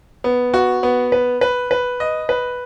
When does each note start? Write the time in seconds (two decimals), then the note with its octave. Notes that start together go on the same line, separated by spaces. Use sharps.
0.24 B3
0.54 F#4
0.83 B3
1.12 B4
1.41 B4
1.71 B4
2.00 D#5
2.29 B4